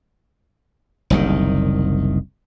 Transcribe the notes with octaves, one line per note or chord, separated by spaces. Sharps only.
F#1 C2 D#3